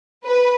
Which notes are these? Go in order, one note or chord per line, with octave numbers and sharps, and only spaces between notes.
B4